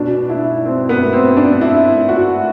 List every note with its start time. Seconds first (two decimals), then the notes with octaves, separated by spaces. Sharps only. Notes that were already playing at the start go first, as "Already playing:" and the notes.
Already playing: B2 D4
0.30 E4
0.65 C4
0.89 B3
1.13 C4
1.37 D4
1.61 E4
2.09 F#4